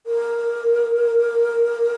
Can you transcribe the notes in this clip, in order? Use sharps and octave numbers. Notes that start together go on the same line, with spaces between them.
A#4